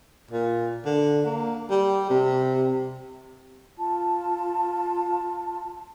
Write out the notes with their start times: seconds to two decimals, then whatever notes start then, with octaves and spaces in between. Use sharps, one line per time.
0.31 A#2
0.85 D3
1.25 A#3
1.70 G3
2.10 C3
3.78 F4 A5